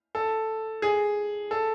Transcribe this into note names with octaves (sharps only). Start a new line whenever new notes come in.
A4
G#4
A4